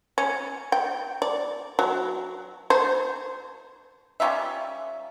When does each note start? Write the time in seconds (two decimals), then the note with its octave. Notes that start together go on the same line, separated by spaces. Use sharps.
0.18 C#4
0.72 G5
1.22 D5
1.79 F#3
2.70 C5
4.20 G3 C#4 F4 E5